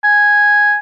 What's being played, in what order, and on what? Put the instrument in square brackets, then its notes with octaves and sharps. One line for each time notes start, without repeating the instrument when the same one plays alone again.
[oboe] G#5